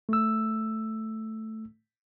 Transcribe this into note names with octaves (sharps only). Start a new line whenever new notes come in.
A3 E6